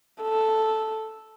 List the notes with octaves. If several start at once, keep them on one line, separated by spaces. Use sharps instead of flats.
A4